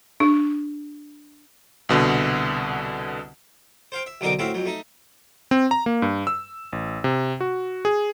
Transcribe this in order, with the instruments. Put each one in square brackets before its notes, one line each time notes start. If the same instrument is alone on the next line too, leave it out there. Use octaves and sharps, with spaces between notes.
[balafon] D4
[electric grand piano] C2 B2 D3
[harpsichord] C5 F5 G5
E5
B1 D3 C4 D#4 A#4 D6
A2 C4 E4 F#4 F5
F2 F#3
A3 D#4
[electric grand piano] C4
A#5
A#3
G2
E6
A1
C3
F#4
G#4